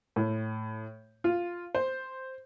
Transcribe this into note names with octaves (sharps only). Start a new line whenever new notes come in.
A2
F4
C5